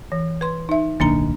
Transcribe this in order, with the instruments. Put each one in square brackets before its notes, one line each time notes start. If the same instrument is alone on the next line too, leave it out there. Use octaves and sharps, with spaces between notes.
[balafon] E3
B4 C6
D#4 E5
[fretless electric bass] D1 B1 D#3 [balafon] A#3 D4 A#5